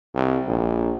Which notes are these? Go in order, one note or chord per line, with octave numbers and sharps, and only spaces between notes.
C2
A#1